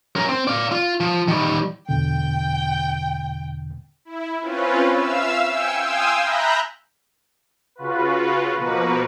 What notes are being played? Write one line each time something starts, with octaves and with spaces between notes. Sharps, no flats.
C#4 A#4
C4
D5 F5
F4
F3
D#3 G3
E2 B2 D3 G5
E4
C4 C#4 F4 B4
E5 F5 E6
G5 G#5 E6 C#7
F5 G5 G#5 C6 D#6 E6
E5 A#5 B5 F#6 G6 A#6
C#3 F4 F#4 B4
B2 F3 A#3 F#4 A#4 B4